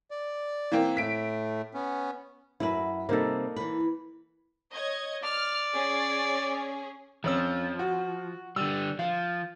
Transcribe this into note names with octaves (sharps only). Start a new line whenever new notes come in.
D5
E3 A#3 C4
A2 A3 B6 D7
B3 C#4
F#2 E4 F#4 B4
C3 G3 A#3 D#4 A4
E3 B4
C#5 D#5 G#6
D5 F6
C#4 G#4 C#5
F2 F3 C#4 E6
F#4
D3 G3 E6
F3 F5